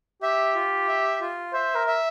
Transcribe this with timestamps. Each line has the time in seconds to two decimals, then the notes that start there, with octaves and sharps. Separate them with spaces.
0.23 G4 E5
0.55 F4
0.88 E5
1.21 F4
1.53 C5 E5
1.75 A#4
1.87 E5